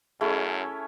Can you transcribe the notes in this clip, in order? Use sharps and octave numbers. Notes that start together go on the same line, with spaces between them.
F#2 A3 C#4 E4 G#4 G#5